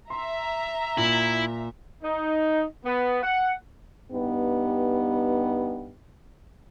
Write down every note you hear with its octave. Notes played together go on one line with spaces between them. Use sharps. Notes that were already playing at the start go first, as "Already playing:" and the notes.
E5 A#5 C6
A#2 E4
D#4
B3
F#5
G2 B3 D#4 G4